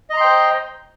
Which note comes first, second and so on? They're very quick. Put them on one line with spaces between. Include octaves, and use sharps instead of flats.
D#5 A#5 C6 G5 C5